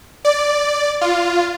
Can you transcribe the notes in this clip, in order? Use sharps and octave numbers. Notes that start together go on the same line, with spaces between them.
D5
F4